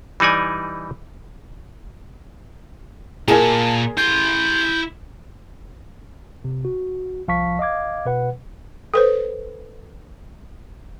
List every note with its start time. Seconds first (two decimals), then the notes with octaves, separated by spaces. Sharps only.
0.20 E3 G3 D#4 D5 G#5
3.28 A#2 G#4 A#4 G#5 A5
3.98 E4 C6 G6
6.44 C3
6.65 F#4
7.28 C2 F3 F5 A5 C#6 B6
7.59 D#5 F5 D6 G#6
8.05 B2 B4 F#5
8.94 A4 B4 C5